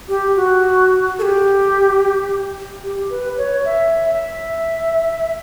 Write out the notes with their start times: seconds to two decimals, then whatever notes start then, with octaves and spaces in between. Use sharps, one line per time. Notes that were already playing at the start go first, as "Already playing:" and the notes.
0.08 G4
0.36 F#4
1.19 A4
1.22 G4
2.83 G4
3.10 B4
3.37 C#5
3.65 E5
4.05 E5